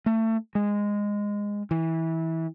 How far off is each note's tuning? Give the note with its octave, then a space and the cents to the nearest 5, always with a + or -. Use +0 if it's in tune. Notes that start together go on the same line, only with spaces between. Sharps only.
A3 +25
G#3 -15
E3 -20